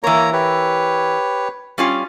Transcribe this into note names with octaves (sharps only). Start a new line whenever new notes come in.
E3 A#3 A#4 C#5 A#5
G4 B4 C#5
G3 C#4 F4